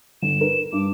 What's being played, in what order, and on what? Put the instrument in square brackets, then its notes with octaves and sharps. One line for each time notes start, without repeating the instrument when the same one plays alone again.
[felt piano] G1 [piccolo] E7
[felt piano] A#4 B4
[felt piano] G2 [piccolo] D6